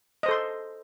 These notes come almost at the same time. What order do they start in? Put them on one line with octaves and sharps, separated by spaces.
D#5 C5 A4 C6